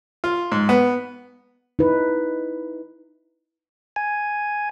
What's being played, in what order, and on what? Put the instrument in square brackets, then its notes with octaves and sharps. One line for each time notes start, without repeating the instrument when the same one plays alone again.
[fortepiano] F4
G#2
B3
[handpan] D#4 E4 B4
[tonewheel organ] G#5